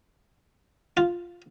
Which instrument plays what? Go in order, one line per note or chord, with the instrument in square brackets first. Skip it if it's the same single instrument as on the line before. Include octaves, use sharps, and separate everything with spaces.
[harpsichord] F4